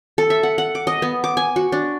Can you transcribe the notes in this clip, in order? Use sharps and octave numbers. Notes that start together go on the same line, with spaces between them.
A4
E5
F#5
F#5
D6
D#5
B3
D6
G#5
F#4
D4